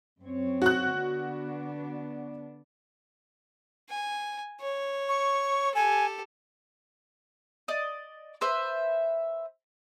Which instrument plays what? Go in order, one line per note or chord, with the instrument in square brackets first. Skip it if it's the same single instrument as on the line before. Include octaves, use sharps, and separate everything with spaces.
[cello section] F#2 C4 C#5
[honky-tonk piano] F#4 F#6
[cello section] D3 B3 D4
[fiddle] G#5
C#5
[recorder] C#6
[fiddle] G4 A4 [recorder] G#5
[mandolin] D5 D#5
B4 C5 E5